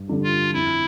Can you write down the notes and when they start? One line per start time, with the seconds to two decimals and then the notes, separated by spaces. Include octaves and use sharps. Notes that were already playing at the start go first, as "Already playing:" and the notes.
Already playing: G2
0.08 D3 G3 D4 A4
0.24 F4
0.53 F2 E4